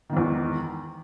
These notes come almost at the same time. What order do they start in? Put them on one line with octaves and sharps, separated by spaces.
D#3 G#2 E2